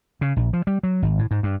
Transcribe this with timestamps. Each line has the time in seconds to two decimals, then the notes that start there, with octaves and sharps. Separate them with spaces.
0.21 C#3
0.36 A#1
0.53 F3
0.67 G3
0.83 F#3
1.02 G#1
1.19 A2
1.31 G#2
1.43 G2